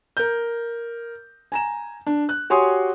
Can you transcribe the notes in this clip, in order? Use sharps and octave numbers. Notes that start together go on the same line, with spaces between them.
A#4 G6
G#5 A#5 E7
D4
F#6
F#4 G4 C#5 G#5 C6 D#6